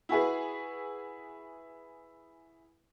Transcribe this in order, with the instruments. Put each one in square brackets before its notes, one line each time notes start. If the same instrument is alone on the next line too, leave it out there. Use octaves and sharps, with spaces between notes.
[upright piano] E4 F#4 G#4 B4